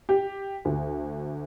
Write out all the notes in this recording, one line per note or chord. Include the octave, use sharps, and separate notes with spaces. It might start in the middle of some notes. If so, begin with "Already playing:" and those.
G4
D2